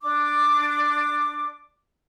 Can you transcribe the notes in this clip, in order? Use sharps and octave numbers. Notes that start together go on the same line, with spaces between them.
D4 D6